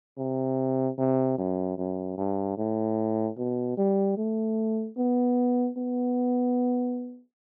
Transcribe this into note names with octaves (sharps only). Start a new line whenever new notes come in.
C3
C3
F#2
F#2
G2
A2
B2
G3
A3
B3
B3